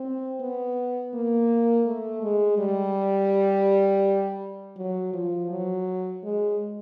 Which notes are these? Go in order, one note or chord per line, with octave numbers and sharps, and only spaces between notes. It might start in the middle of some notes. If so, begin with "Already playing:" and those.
Already playing: C4
B3
A#3
A3
G#3
G3
F#3
F3
F#3
G#3